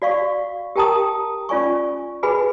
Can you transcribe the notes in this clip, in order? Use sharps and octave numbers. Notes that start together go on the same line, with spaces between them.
F#4 D5 F5 C#6
G4 A#4 G5 A5 A#5 D#6
C#4 F4 D5 G#5 C#6
F#4 G#4 B4 G#5 B5